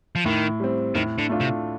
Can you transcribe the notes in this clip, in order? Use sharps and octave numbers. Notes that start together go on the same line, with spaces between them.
F3
A2 D#3
G3 C4
A2 D#3
D3
A3 D4 F4
C3